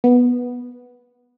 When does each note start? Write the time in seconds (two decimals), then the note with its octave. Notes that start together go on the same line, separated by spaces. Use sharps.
0.04 B3